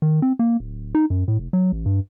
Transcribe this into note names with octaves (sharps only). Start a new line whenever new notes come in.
D#3
C4
A#3
D1
D#4
F#2
A2
F1
F#3
A1
G2